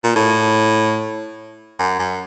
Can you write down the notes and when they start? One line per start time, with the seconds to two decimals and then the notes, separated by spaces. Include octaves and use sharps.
0.04 A#2
0.16 A2
1.79 F#2
1.99 F#2